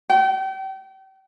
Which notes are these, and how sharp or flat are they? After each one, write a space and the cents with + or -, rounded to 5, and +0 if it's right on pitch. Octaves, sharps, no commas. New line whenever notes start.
G5 -35